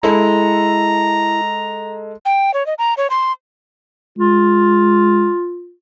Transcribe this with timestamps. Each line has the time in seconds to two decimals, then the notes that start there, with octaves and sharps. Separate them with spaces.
0.03 G#3 E4 A4 A#5
2.25 G5
2.54 C#5
2.66 D#5
2.78 A#5
2.97 C#5
3.10 C6
4.18 G#3 F4